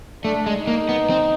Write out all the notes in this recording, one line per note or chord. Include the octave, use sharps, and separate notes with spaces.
A3 D4
G#3
D#4
A#3
B3
C4